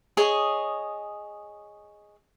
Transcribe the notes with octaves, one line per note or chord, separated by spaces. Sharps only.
G#4 C#5 D#5